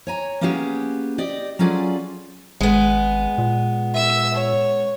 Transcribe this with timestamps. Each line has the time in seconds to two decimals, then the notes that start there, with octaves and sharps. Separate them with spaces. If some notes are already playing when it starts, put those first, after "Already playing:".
0.07 C#5 G#5 A#5
0.41 A#3 B3 C#4 D#4 G4 G#4
1.18 G4 D5 D#5
1.59 F#3 C#4 F4 G#4 A4 D5
2.61 G#1 G#3 B3
3.38 A#2
3.94 E5 E6
4.34 C#5